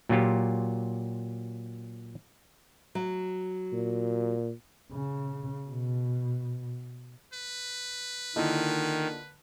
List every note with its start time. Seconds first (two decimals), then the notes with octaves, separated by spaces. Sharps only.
0.09 A#2 F#3 F4 G4
2.95 F#3
3.73 A#2
4.92 C#3
5.69 B2
7.33 B4
8.36 D3 D#3 A#3 E4 F4 D#5